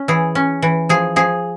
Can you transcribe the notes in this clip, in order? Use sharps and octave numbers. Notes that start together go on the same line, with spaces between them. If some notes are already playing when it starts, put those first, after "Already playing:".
Already playing: C#4
E3 G#4
C#4
E3
F3 G#4
F3 G#4